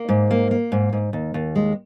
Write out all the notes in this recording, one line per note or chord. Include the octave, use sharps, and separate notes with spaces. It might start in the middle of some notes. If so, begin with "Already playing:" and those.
Already playing: A#3
G#2
A#3
A#3
G#2
G#2
D#2
D#2
G#3